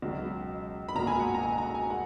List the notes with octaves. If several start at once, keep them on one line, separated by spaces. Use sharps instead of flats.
C#2 B2 F#3
B5
C#2 B2 A#3 F4 A#5
G#5
F#5
A#5
G#5
A#5
G#5
G#3 F#5